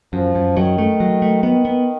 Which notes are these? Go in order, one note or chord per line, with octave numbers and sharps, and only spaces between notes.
F#2 F3
F#2
D#3 F#3
A3
F#3
A3
D#3 B3
B3